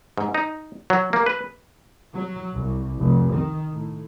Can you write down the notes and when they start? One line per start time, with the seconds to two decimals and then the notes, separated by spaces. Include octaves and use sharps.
0.18 G#2
0.34 D#4
0.90 F#3
1.13 A#3
1.26 B4
2.15 F#3
2.53 C2
2.99 F1
3.32 D#3
3.73 A2